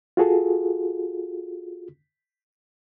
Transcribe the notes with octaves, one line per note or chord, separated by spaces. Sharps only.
F4 F#4 G#4 A4